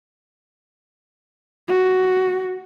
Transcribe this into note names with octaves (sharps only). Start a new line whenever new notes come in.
F#4